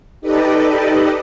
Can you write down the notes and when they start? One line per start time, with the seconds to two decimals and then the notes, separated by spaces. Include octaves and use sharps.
0.21 D#4 G4 A4 B4 D5 D#5